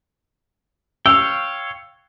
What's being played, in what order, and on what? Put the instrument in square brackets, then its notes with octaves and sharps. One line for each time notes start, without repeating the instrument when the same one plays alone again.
[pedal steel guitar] C#5 F5 G5 [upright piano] E6